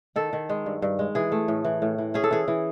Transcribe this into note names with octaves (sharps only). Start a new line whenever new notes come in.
D#3 A4
D#3
G#3
G2
G2
G#3
E3 G#4
A3
A2
E3
A2
E3
C#4 G#4
A4
E3 G#4
E3